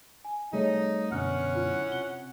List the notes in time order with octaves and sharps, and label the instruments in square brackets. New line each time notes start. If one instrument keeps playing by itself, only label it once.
[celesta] G#5
[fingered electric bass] C3 G3 A3 [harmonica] D#4 [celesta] G#4 C#5 D#5
[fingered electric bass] F#2 B2 D3 [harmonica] C#4 F#5 [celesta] F6 F#6
[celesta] E4 F4
[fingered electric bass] C3 [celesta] G7